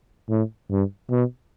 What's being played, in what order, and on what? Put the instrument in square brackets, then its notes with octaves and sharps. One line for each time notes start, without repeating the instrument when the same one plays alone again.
[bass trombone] A2
G2
B2